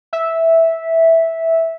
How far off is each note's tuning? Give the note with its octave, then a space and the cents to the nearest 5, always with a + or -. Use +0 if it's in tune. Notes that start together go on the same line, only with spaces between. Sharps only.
E5 -5